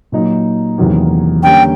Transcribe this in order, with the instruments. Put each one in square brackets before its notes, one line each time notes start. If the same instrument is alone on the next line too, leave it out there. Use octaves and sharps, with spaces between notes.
[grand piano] A#2 F#3 A#3 D#4
E2 C3 D#3 F#3 A#3
[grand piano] D3 G3 A#3 C#4 [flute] G5